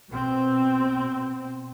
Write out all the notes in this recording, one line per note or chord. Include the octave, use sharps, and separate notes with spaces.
B2 C4